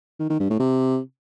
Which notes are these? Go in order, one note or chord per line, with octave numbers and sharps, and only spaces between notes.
D#3
D#3
G2
A2
C3